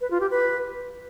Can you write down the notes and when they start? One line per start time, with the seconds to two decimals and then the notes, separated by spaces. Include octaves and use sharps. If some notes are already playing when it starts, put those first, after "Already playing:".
0.01 B4
0.11 F4
0.21 G4
0.31 B4